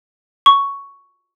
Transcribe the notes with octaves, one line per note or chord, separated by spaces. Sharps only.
C#6